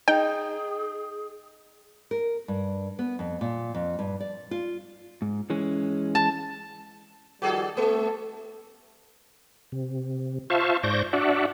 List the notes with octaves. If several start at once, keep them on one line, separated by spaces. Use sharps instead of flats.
D#4 G#4 G5
A#4
G2
B3
F2
A#2
F2
G2
D5
F4
G#2
E3 G#3 C#4
A5
D#3 F3 G3 F#4 G#4 A4
A3 A#3 A4
C3
F4 C5 E5 F5 A5 C#6
G#2 C5 D5 C#6 G6 A#6
D4 F#4 D5 E5 F#5